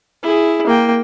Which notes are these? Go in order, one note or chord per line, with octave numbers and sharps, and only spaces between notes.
E4 G#4
A#3 G5